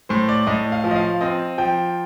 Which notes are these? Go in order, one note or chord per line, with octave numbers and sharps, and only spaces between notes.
A2 C5
D5
A2 D#5
F5
F3
D#5
F5
C4 D#5
F3 G5